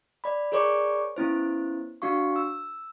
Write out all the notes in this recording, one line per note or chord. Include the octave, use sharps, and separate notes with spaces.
D5 B5
G#4 A#4 C#5 D5 C#6 D6
B3 C#4 E4 C5
D4 F#4 F5 C#6
E6